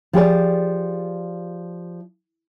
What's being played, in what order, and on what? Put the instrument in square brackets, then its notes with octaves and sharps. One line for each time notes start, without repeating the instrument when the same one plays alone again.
[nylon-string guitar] F3 G4 G#4 D5